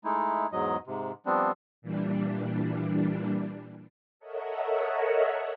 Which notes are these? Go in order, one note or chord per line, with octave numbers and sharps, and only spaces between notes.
G#3 A3 D#4 E4
E2 G#2 F#3 D#5
G#2 C3
F3 G3 B3 C4 D4
A#2 E3 G3 D4
A4 A#4 C#5 D#5 E5 F#5